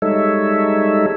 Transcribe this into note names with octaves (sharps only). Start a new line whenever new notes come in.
G3 G#3 D#4 A4 C#5 E5